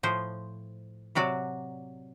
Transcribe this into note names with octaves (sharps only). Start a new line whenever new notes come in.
A2 F3 C5
C3 F#3 F#4 D5